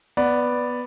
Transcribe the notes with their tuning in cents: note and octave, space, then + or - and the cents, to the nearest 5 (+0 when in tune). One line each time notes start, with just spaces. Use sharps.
B3 +0 D5 +0